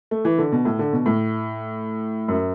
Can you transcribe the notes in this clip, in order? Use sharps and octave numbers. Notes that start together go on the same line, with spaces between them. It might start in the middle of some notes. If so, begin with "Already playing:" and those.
A3
E3
D3
B2
A2
D3
B2
A2
F#2